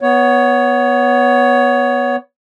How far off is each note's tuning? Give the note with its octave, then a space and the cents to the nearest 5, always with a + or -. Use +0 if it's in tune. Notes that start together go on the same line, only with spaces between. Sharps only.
B3 +0 C#5 +15